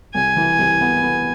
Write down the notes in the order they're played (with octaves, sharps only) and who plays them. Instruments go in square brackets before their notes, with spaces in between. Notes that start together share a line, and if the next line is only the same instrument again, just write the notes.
[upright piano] C2 [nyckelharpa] G#5
[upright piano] E3
C2
B3
B3